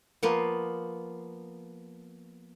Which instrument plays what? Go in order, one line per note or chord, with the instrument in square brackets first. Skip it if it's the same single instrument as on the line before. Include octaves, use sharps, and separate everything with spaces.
[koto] F3 A#3 B3